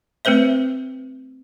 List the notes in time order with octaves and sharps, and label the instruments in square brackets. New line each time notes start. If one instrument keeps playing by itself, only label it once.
[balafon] A3 C4 B4 C5 E5